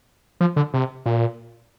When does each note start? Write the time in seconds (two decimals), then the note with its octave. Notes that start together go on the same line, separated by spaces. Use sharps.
0.41 F3
0.56 D3
0.74 C3
1.06 A#2